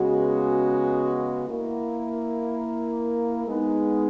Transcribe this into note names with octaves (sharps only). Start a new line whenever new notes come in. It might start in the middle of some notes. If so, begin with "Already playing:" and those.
Already playing: C#3 G#3 B3 F#4
A#3 E4 A#4
G#3 B3 D#4